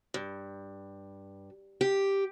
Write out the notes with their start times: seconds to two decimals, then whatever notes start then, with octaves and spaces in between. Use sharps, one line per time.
0.14 G2
1.81 G4